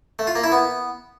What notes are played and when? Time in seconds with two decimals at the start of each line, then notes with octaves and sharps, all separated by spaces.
0.19 A3
0.27 F4
0.35 A#3
0.44 E4
0.52 B3